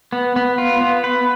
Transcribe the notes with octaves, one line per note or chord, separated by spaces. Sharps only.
B3
B3
F4
B3
B4